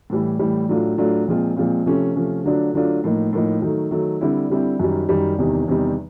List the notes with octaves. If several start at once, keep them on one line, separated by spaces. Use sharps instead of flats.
A2 E3 G3
A2 E3 G3
A2 F#3 A3 D4 F4
A2 F#3 A3 D4 F4
A#2 F3 G#3 C4 F4
A#2 F3 G#3 C4 F4
C3 F3 A3 C#4
C3 F3 A3 C#4
D3 F#3 A3 D4 F4
D3 F#3 A3 D4 F4
A2 F3 A#3 D#4
A2 F3 A#3 D#4
D#3 F#3 A3
D#3 F#3 A3
D3 G3 C4 E4
D3 G3 C4 E4
F#2 D#3 G3
F#2 D#3 G3
E2 C3 D#3 G3
E2 C3 D#3 G3